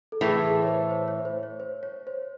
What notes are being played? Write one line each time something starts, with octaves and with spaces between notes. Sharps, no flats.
A4
A2 E3 A3 G#4
G#4
C#5
C5
C5
C#5
C5
C#5
C5
C#5
C5